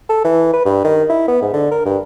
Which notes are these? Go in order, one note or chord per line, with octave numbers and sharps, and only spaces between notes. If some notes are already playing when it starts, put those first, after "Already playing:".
A4
E3
B4
G2
D#3
E4
B3
G#2
D3
A#4
G2